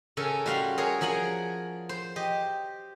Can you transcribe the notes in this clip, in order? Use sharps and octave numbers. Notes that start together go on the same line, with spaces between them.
C#3 C#4 A4 A#4 G#5
G3 F#4 F5 C6
G#4 A#4 C#5
F3 G#4 A#4 F#5 G#5
C5
G4 D#5